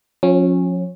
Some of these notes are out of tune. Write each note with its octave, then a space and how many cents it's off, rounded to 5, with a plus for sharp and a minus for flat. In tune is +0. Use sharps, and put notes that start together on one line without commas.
F3 +35 C#4 -20